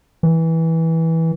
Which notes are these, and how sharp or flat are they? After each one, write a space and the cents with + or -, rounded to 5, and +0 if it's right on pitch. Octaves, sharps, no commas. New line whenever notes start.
E3 -15